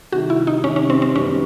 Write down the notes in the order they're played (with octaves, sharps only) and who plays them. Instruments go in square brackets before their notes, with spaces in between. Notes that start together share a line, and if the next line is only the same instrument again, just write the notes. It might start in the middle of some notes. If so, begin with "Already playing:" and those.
[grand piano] C3 D#3 G3 [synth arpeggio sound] F#4
[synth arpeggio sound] E4
D#4
[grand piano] C3 D#3 G3 [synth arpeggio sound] C#4
[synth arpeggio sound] C#4
C4
C4
[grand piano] F#2 D#3 G3 B3 [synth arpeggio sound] C#4